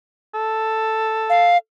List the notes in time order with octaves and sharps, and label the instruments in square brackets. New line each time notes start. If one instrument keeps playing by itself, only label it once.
[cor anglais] A4
[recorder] F5